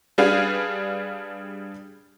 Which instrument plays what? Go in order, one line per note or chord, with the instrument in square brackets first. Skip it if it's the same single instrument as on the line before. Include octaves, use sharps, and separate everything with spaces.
[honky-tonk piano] G3 D4 G#4 B4 F5